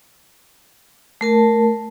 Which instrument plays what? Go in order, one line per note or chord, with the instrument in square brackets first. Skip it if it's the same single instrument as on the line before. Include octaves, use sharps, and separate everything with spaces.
[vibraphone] A3 A#4 A5